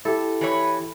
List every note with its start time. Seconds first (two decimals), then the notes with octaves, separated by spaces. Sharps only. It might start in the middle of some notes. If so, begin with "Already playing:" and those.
0.05 E4 G4 A4
0.41 E3 B4 C#5